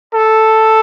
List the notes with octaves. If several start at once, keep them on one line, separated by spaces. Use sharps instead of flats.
A4